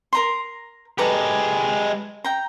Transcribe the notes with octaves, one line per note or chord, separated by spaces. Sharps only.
A#4 A#5 C6
G#3 G4 A4 B4 A#5
G5 A#5